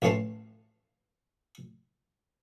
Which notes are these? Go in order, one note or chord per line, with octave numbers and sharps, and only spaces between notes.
A1 A2 E3 C#4 A5 C6